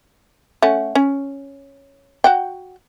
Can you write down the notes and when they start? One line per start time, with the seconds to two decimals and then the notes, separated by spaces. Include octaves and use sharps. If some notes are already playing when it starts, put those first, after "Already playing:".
0.62 A3 C#4 F#5
0.95 C#4
2.24 F#4 F#5 G5